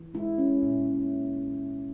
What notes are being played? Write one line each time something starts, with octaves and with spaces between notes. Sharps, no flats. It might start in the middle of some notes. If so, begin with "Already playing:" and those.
Already playing: E3
G#3 E4
C#4
A#2